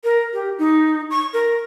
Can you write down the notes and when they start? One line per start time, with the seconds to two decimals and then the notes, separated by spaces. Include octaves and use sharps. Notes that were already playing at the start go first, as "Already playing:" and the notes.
0.04 A#4
0.34 G4
0.58 D#4
1.11 C#6
1.33 A#4